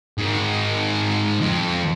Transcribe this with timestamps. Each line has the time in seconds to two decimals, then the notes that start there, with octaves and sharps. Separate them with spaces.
0.18 G#2 D#3
1.41 F2